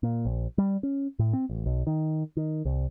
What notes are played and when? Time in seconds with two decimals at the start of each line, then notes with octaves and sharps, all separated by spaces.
0.03 A#2
0.25 A#1
0.58 G3
0.83 C#4
1.19 A2
1.33 C4
1.50 A1
1.66 B1
1.87 D#3
2.37 D#3
2.65 C2